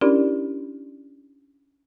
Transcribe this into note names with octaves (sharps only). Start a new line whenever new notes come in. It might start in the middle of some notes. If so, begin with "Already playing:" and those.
C#4 D4 E4 G4 A#4 D5